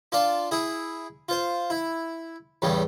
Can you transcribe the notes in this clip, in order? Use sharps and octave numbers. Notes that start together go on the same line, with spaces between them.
D4 F4 D5 A5
E4 G#4
F4 C5
E4
E2 A2 C#3 G3